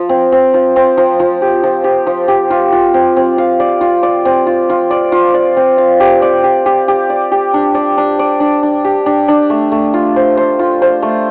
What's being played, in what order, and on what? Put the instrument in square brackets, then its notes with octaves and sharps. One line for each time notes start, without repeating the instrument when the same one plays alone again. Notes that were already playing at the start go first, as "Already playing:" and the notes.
Already playing: [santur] F3
C4
C4
F3
C4
F3
F3
G4
F3
G4
F3
G4
F4
F4
C4
C4
F5
D5
F4
D5
C4
F4
F4
D5
F4
D5
C4
F5
G4
D5
G4
G4
G4
D5
G4
D4
D5
D4
D5
D4
D4
G4
D4
D4
A3
A3
F4
C5
C5
F4
C5
A3